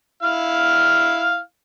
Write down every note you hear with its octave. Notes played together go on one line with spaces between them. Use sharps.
E4 F5 F6